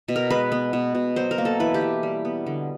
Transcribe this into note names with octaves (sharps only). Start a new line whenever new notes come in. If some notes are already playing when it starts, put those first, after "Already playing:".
B2
A#4
G#3 B4
B3
B2
B2
F#3 C5
A#4
A#3
A4
E3 B4
G4
E3
G3
B3
D3